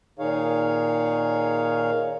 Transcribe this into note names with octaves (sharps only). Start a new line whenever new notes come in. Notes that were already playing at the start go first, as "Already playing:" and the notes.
A#2 D#3 D#4 G#4 C#5 F5